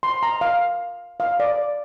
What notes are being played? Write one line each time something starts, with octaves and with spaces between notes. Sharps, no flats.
C6
A#5
F5
F5
D5